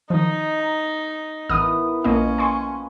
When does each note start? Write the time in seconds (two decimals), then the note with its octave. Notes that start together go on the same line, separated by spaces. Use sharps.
0.10 D#3 F3 D#4 D#5
0.59 A#5
1.49 A1 B3 E4 A#4 D#6 F6
2.04 A#1 F3 A#3 C#4 B4 D#5
2.38 G#5 C6 C#6